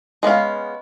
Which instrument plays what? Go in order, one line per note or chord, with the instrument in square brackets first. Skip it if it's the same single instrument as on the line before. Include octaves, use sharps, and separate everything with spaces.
[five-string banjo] G#3 B3 C#4 F5